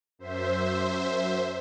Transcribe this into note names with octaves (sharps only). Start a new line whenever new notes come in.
F#2 C5 E5